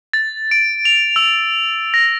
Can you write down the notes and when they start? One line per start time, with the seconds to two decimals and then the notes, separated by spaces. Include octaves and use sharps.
0.13 A6
0.51 D7
0.85 F7
1.16 E6
1.94 A#6